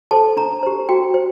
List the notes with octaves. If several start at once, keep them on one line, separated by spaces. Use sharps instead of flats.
A4 C5 A5
D4 A#5
G4 C5
F#4 G5
C5